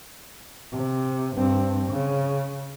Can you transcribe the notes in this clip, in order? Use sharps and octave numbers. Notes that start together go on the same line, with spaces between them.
C3
G2 C4
C#3